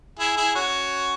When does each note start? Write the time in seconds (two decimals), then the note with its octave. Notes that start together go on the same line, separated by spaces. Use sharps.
0.19 E4 G#4
0.37 E4 G#4
0.55 C#4 F#4